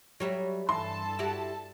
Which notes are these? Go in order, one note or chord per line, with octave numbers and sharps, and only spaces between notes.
F#3 G3 E5
G2 E3 A4 A5 C6
E4 F#4 G4